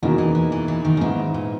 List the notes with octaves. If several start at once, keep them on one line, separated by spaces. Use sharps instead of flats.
E2 B2 D#3 A#3 D#4
E3
E3
E3
E3
D#3
C#3
G#2 D#3 E3 B3 E4
A#2